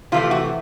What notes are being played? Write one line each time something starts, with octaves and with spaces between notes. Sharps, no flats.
C3 E3 A3 F4
F#4